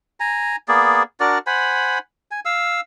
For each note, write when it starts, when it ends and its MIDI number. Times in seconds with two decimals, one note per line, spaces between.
0.20 0.56 80
0.20 0.56 82
0.68 1.03 58
0.68 1.03 59
0.68 1.03 68
0.68 1.03 74
1.20 1.38 62
1.20 1.38 66
1.20 1.38 70
1.20 1.38 74
1.47 1.99 72
1.47 1.99 78
1.47 1.99 80
1.47 1.99 83
2.31 2.40 80
2.45 2.81 77
2.45 2.81 88